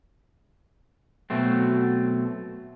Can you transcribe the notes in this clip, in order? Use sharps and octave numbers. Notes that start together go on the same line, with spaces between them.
B2 F#3 A3 C4